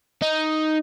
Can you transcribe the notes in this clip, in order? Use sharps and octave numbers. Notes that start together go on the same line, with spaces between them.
D#4